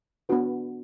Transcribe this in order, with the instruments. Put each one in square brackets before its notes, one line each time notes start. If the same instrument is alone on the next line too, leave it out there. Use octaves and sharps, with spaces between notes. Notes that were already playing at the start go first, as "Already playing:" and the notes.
[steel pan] B3 D4 F#4 B4